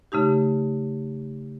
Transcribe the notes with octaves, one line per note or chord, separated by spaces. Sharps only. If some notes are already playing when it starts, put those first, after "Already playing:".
C#3 A3 D#4 G4